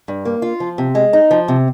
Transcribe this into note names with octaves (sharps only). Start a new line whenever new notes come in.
G2
A#3
F4
F3
C3
G#3
D#4
F3
C3